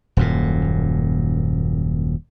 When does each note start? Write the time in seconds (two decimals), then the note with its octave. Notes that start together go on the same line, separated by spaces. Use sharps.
0.17 D#1 F#2 A#2